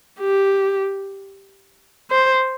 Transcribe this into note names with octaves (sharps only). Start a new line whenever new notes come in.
G4
C5